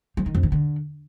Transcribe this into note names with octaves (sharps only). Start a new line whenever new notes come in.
F3
D#3
F2
D#3
D3